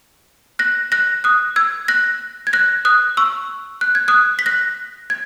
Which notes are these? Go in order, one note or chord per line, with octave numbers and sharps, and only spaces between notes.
F#6 A#6
F#6 A#6
D#6 F#6
E6 G#6
F#6 A#6
G#6
F#6 A#6
D#6 F#6
C#6 E6
F#6
G#6
D#6 F#6
B6
F#6 A#6
G#6